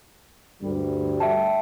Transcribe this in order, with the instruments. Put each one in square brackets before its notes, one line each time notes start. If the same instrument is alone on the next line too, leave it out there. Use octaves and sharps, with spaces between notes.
[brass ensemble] D2 G2 G3
[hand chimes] E5 G5 A5